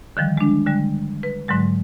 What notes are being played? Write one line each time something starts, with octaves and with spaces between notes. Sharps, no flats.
D3 D#3 F3 G3
G#3 D4
D3 G3 G#3
B4
G#2 D3 F#3 G#3